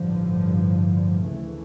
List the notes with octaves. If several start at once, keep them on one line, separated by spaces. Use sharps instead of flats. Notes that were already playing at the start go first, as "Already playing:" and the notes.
Already playing: A1 G2 D3 F3
D2 C#3 E3 A3